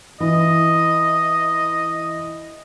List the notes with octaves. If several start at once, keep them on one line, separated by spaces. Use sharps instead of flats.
E3 D#5